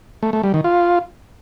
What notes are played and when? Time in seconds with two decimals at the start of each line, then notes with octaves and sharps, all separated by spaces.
0.23 A3
0.33 A3
0.43 G3
0.54 D#3
0.64 F4